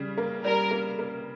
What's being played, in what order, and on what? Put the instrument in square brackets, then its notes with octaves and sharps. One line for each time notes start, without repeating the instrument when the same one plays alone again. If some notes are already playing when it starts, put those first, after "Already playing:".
Already playing: [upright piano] C#3 G3
A#3
[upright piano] G3 [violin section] A#4
[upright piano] A#3
A#3